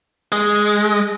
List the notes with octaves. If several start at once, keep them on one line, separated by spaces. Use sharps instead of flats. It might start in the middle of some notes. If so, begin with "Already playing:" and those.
G#3